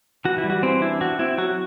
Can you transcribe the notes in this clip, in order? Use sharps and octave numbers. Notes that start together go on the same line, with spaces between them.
E3 F#4
E4
G3
F#4
E3 C4 C5
D4 E4
C4 F#4
C4 E4
F#3 F#4